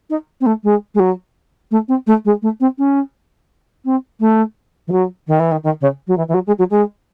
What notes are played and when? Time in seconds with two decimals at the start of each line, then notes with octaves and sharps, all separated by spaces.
0.10 D#4
0.41 C4
0.46 A3
0.64 G#3
0.94 G#3
0.99 F#3
1.71 A3
1.88 C4
2.07 A3
2.25 G#3
2.42 A3
2.60 C4
2.78 C#4
3.85 C4
4.20 A3
4.87 E3
4.92 F#3
5.28 D#3
5.40 E3
5.51 D#3
5.63 D#3
5.81 C#3
6.07 F#3
6.17 E3
6.28 E3
6.34 F#3
6.47 G#3
6.58 F#3
6.70 G#3